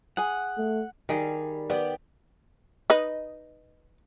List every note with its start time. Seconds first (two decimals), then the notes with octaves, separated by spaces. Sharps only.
0.17 G#4 F#5 G#5
0.58 A3
1.09 D#3 G3 G#4
1.70 B3 G4 D5
2.90 D#4 B4 D#5